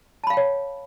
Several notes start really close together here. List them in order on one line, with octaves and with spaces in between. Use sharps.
A5 B5 F5 G5 C#5